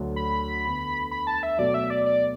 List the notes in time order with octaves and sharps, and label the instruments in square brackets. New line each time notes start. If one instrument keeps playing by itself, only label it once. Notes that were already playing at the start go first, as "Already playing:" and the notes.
Already playing: [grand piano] D2 D3 F#3 D4
[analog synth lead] B5
[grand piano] E2 D3 B3
[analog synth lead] B5
A5
E5
[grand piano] B2 F#3 A3 [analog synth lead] D5
[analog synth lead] E5
D5
D5